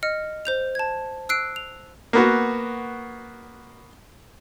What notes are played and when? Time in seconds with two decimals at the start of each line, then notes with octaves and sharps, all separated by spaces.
0.03 D#5 F6 C#7
0.45 C5 G6 F7
0.75 A5 G#6
1.29 E6 F#6 C7 D7
1.56 F7
2.13 A#3 B3 F#4